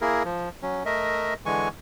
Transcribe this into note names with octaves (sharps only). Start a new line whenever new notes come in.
A#3 E4 G#4 A#4
F3
F#3 C#4
A3 A#4 D#5 E5
D3 E3 G#3 G#5 C#6